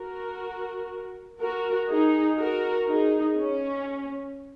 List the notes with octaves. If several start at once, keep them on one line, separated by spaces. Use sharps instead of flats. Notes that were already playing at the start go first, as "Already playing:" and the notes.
Already playing: F#4 A#4
F#4 A#4
D#4 G#4
F#4 A#4
D#4 G#4
C#4